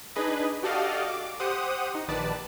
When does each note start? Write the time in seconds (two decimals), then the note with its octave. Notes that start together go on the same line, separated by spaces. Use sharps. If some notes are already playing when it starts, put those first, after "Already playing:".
0.16 D4 D#4 G#4 B4 D#5
0.63 F#4 G4 A4 D5 D#5 F5
1.08 D6
1.40 G4 C5 F#5 D#6
1.95 D#4
2.08 A#1 D#3 B4 D5 A5